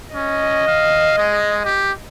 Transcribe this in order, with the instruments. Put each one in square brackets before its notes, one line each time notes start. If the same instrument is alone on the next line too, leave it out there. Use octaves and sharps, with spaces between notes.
[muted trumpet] C#4 [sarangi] D#5
[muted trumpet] F5
G#3
G4